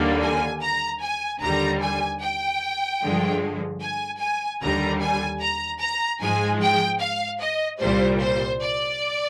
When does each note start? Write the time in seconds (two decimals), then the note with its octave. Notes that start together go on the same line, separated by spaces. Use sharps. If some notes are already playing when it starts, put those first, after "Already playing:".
Already playing: D#2 D3 G3 A#3
0.22 G#5
0.62 A#5
1.02 G#5
1.41 D#2 D3 G3 A#5
1.82 G#5
2.21 G5
3.02 G2 D3 F3 G#3
3.82 G#5
4.21 G#5
4.61 D#2 D3 G3 A#5
5.01 G#5
5.41 A#5
5.80 A#5
6.21 G#2 F3 G#3 G#5
6.61 G5
7.01 F5
7.40 D#5
7.80 C2 A#2 G3 C5
8.20 C5
8.61 D5